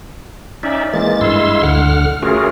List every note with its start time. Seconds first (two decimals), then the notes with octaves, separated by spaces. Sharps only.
0.63 C#4 D#4 D5 E5
0.94 E3 G#3 A#3 A6
1.21 G2 G#3 E4 F5 C6 E6
1.63 D2 D3 F#5 F6
2.22 A3 C#4 F4 F#4 G#4 A#4